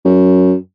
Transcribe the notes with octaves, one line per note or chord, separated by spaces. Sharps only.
F#2